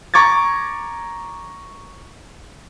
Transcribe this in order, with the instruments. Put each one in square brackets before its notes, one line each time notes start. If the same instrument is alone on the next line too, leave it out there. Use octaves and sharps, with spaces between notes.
[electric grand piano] A#5 C#6 D6 G#6 A6